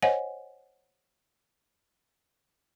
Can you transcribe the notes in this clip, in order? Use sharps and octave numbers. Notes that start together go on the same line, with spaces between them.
C5 C#5 D#5 F#5 G#5